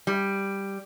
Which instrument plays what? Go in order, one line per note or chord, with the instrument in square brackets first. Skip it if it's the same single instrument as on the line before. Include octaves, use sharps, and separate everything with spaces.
[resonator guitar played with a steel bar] G3